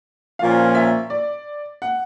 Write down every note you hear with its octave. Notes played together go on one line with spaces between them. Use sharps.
A#2 F3 A#3 C#4 F4 F5
E5
D5
F#5